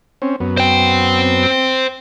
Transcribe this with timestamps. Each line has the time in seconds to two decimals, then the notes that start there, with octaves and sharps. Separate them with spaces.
0.22 C4 C#4
0.40 F#2 B3
0.58 C5 G5